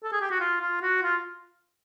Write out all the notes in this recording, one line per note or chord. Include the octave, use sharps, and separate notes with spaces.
A4
G#4
G4
F#4
F4
F4
F#4
F4